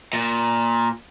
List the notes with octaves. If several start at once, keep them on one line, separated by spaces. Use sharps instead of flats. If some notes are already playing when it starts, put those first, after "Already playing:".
A#2